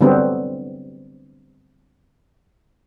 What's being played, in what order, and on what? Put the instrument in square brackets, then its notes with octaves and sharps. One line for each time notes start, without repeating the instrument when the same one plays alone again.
[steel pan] D3 F#3 G3 B3 C4